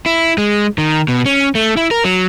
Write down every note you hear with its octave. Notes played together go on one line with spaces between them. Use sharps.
E4
G#3
D#3
B2
C#4
A3
E4
A#4
F#3